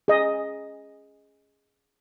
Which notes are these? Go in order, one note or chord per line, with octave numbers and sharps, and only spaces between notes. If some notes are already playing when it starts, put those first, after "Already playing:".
G#4 D#5